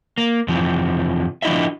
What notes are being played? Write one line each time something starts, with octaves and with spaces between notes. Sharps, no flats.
A#3
F2 C3 E3 F3
F3 D4 E4 F#4 D#5 E5